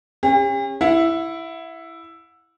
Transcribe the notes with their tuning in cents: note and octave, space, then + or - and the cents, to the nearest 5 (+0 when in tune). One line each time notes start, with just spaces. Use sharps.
C#4 -15 G4 +45
E4 +5 F#5 -35